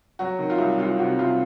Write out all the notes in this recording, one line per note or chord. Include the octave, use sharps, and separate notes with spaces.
F#3 F#4
D#3
F4
C2
C2 F4
C3 F#4
C2 F4